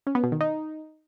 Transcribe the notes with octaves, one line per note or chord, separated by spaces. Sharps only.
C#4
B3
B2
D#3
D#4